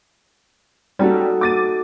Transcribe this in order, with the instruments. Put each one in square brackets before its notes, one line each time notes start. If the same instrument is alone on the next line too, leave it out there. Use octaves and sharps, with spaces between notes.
[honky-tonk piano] G3 C#4 [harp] D#4 F#4 A4
[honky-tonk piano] D6 A6 D#7